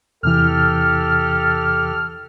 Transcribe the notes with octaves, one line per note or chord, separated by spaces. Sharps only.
E2 C3 E3 G4 A4 F6